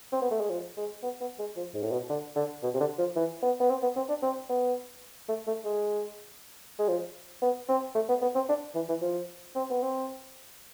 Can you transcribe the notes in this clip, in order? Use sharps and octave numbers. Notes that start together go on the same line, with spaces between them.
C4
B3
A3
G#3
F3
G#3
B3
B3
G#3
F3
G#2
A2
B2
D3
D3
B2
C3
D3
F3
E3
B3
B3
C4
B3
C4
D4
C4
B3
A3
A3
G#3
G#3
F3
B3
C4
A3
B3
B3
C4
D4
E3
E3
F3
C4
B3
C4